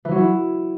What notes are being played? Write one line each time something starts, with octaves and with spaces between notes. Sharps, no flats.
E3
F#3
E4